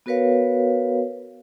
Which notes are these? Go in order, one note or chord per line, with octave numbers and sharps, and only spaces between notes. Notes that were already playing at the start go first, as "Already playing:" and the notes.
B3 F#4 A#4 B4 C#5 F5